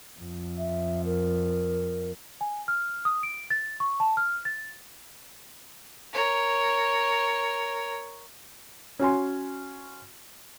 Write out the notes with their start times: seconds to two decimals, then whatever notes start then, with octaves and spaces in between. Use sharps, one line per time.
0.19 F2
0.58 E5
1.05 A#4
2.41 G#5
2.68 F6
3.05 D#6
3.23 D7
3.50 A6
3.80 C#6
4.00 A5
4.17 F6
4.45 A6
6.13 A#4 C#5
8.99 C#4 F#4 G#5 C6